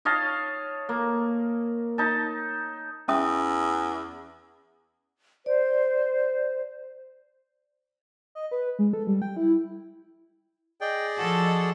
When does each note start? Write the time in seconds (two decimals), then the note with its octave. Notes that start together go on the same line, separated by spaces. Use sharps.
0.05 C#5 D#5 F5 A5
0.89 A#3
1.98 D#4 A5
3.08 E2 C#4 E5 D#6
5.46 C5 D5
8.35 D#5
8.51 B4
8.79 G#3
8.93 A4
9.07 G3
9.22 G5
9.37 E4
10.81 G#4 D5 D#5 G5
11.18 F3 F#4 A4